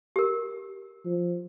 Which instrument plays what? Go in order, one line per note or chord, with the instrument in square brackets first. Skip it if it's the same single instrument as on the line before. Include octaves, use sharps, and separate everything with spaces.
[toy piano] G4 A#4
[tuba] F3